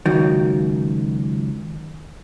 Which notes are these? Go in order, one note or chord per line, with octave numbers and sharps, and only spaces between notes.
C#2 F#2 D#3